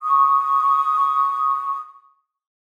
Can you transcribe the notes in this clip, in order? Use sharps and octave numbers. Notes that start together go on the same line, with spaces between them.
C#6 D#6